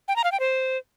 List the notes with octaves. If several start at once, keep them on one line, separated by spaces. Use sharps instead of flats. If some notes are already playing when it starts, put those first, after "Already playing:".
G5
A#5
F5
G5
C5